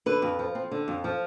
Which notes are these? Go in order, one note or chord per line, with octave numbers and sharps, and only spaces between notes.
D3 B4
F2
F3
C4
D3
F2
F3